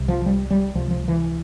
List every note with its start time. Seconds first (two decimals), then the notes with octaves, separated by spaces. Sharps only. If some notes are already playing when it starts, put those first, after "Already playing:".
Already playing: C2 C3
0.08 F3
0.26 G3
0.51 G3
0.75 C#2 C3 F3
0.91 F3
1.08 E3